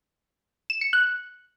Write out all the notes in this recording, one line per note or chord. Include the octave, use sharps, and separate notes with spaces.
E7
C#7
F#6